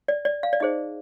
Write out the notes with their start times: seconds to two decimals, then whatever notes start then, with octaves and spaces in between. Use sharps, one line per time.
0.08 D5
0.25 D5
0.43 F5
0.53 D5
0.60 D#4 G#4 C5 D#5